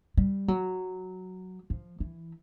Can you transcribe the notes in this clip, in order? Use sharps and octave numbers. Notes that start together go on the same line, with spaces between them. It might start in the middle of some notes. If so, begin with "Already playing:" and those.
G3
F#3
F3
E3